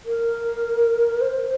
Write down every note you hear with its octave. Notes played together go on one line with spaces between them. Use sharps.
A#4
C5